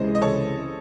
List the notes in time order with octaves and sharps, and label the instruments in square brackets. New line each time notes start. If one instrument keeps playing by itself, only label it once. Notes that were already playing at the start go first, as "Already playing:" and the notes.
Already playing: [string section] C#2 C3 E3 G#3 [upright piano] C5 D#5
[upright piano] D#5
A4 C#5